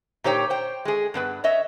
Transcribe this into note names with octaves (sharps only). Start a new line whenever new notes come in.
A#2 D#4 G4 C5 C#5 G5
C5 G5
G#3 G#4
G2 B3 B4
C#5 D#5 E5